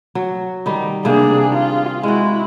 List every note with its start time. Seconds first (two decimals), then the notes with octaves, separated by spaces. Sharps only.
0.15 F#3
0.66 D#3 G3 D#4
1.05 C3 A#3 D4 G#4
1.54 F4
2.03 G#3 E4 F#4